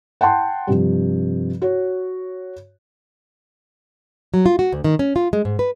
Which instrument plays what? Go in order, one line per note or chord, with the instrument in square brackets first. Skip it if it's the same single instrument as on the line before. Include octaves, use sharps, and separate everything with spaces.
[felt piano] F#5 G5 A5 C6
G2 C3 F3
F#4 C#5
[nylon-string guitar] F#3
F4
F#4
D2
D#3
C#4
F4
G#3
G#2
B4